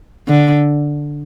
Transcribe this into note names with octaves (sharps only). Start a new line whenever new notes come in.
D3